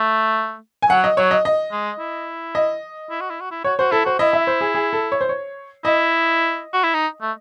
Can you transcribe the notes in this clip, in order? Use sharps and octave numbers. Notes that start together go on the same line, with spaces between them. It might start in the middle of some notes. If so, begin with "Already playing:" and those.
Already playing: A3
G#5
F#3 F#5
D#5
F#3 C#5
D#5
D#5
G#3
E4
D#5
E4
F#4
E4
F#4
E4
F#4 C#5
F#4 C5
E4 A4
F#4 C5
E4 D#5
E5
C5
G#4
G#4
A4
C#5
C5
C#5
E4 D#5
F#4
E4
D#4
A3